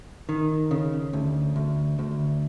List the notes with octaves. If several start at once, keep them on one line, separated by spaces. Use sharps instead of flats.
D#3
C#3
D2
D2
D2